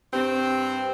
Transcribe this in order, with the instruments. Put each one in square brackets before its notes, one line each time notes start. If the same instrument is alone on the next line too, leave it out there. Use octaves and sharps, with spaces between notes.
[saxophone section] G2 C4